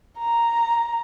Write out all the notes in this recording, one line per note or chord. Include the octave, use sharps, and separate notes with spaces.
A#5